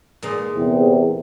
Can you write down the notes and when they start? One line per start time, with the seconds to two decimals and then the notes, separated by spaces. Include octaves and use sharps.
0.22 A#2 G#3 D#4
0.56 E2 C3